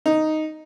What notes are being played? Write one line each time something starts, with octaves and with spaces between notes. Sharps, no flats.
D#4